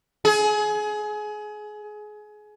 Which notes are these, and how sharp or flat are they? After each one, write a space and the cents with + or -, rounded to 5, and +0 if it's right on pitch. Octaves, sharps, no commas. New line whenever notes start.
G#4 +25